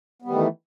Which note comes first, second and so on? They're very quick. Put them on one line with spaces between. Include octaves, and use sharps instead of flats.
B3 G3 D#3 A3 E3